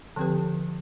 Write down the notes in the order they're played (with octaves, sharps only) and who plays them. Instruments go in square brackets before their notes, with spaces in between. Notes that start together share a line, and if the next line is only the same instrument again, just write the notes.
[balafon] D3 F3 C4 G4 B4